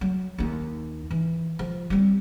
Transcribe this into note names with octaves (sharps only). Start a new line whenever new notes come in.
F#3
D#2 D#4
E3
F3
G3 C4